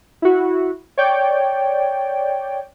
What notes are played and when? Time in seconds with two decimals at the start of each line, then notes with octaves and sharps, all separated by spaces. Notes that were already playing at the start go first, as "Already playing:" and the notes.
0.22 E4 F#4
0.98 C#5 D5 G5